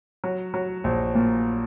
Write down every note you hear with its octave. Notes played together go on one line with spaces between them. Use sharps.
F#3
F#3
A#1
A#2